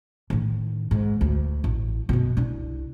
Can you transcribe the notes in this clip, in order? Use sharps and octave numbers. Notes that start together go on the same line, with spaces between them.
A2 D#3
G#2
D2
A1
F#2 B2
C2 D4